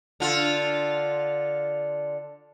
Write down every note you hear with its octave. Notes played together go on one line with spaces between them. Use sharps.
D3 F4